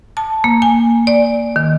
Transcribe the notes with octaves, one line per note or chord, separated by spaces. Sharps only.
A5
A#3
G#5
D5
D#3